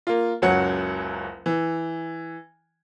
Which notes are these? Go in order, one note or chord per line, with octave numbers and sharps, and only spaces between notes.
A#3 F4
F#1 C#2 F#3 C#5 F#5 C#7
E3